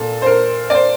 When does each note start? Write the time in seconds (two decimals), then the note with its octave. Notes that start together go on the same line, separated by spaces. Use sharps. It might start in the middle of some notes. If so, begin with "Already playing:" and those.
Already playing: A#2 A4
0.22 C5
0.26 A#4
0.70 D5
0.75 C5